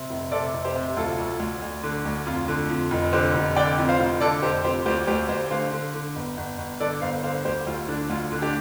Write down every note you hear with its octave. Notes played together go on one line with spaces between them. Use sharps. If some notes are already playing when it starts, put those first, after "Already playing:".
Already playing: C3
F1
C3 A4 D5
F1
G4 C5
C3
D2 F4 A4
D2
D2
D2
D3
D2
F2 F4
D3
F2
F1
D3 G4 C5
F1
D3 D5 G5
F2
C5 F5
F1
D3 A4 D5
F1 G4 C5
F2 G4 C5
D2 G4 C5
D2 G4 C5
D2 G4 C5
D3 C5 F5
D3
D3
G1
G1
G1
D3 A4 D5
G1 C5 F5
D3 C5 F5
D2 G4 C5
D2 F4
D3 D4
D2 F4
D3
D4 G4